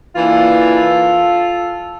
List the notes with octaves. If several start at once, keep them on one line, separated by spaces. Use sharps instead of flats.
E3 A#3 D4 F4 A4